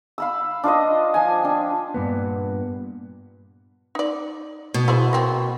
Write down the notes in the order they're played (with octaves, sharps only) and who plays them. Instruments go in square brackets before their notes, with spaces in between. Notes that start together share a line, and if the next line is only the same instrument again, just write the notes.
[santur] F5 B5 E6
D4 F4 C5 D#5
F3 G#5
D4 G5
[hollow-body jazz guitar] G2 A#2 B3
[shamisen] D#4 D5
[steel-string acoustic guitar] B2
[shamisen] E4 G#4 C5
A#3 C4